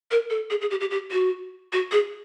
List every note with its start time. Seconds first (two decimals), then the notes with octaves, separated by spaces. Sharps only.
0.11 A#4
0.30 A4
0.50 G#4
0.61 G#4
0.70 G4
0.81 G4
0.91 G4
1.12 F#4
1.73 F#4
1.92 G#4